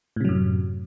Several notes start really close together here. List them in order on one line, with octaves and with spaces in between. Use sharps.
A2 C3 F#3 F#2